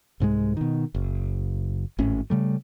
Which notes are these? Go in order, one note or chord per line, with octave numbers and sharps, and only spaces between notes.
C2 G#2 F#3 G#3
B2 D#3
F#1
G#1 A2 C#4
C#3 G3 A3